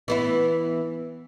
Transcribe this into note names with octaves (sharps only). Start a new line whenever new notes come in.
E3 B3 E4